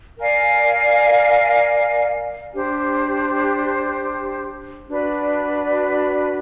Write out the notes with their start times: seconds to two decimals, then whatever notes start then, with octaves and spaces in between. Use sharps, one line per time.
0.18 A#4 D5 F5 G#5
2.54 D4 G4 C5
4.89 D4 F#4 B4 D5